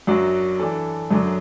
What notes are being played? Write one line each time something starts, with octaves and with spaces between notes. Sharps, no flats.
F#2 F#3 D4 F#4 D5
E3 D4 A4
F#2 D3 F#3 D4